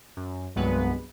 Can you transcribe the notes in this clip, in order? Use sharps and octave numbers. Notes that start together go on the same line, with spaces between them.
F#2
C2 G2 F#3 G#3 B3 B4